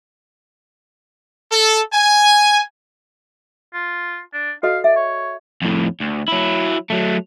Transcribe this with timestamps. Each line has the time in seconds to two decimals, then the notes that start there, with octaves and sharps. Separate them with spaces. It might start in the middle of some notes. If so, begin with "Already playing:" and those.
1.52 A4
1.94 G#5
3.74 F4
4.33 D4
4.63 F#4 A4 D#5 F5
4.84 D5 E5
4.96 C#5
5.62 F2 A2
6.00 D2
6.28 F#3 E4
6.90 F#3 A3